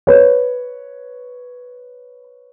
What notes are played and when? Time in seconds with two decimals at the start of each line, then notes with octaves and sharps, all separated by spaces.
0.07 B4 C#5